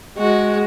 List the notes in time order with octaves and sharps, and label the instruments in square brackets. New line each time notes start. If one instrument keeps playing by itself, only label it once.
[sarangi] G#3 [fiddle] F#4